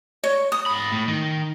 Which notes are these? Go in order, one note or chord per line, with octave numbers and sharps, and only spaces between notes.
C#5
D#6
G#2 B5
A2
D#3